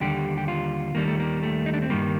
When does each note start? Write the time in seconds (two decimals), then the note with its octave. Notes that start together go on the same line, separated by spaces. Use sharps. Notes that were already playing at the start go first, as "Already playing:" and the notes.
0.01 D#2 D3 G3 G4
0.37 G4
0.48 F4
0.95 D#2 D#3 G3 A#3
1.08 A3
1.20 A#3
1.43 A3
1.66 D#4
1.74 D4
1.82 C4
1.90 G2 D#3 G3 A#3